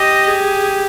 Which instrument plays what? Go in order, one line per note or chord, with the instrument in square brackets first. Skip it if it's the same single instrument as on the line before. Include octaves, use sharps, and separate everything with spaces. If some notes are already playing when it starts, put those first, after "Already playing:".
Already playing: [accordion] G4 [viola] D#5
[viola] G#4